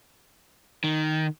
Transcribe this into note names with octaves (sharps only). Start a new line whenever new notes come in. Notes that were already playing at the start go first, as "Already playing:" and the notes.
D#3